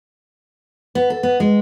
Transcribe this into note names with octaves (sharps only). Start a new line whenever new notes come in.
B3
A4
B3
G#3